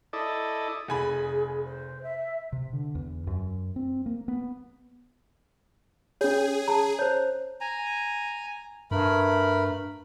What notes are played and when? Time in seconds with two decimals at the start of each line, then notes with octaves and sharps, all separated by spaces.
0.13 E4 A4 D5 D#5
0.88 F1 G#4 G#5 B5
1.66 C5
2.03 E5
2.53 C3
2.73 D3
2.95 E2
3.27 F#2
3.76 C4
4.06 A#3
4.28 B3
6.21 C#4 G#4 C#5
6.68 A5 A#5
6.99 C5 C#5
7.61 G#5 A#5
8.91 G2 A3 A#4 B5